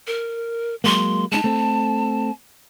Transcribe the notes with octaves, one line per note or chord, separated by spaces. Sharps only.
A#4
F#3 G#3 A#3 C6
G#3 C#4 D#4 A5
A3 C4 A4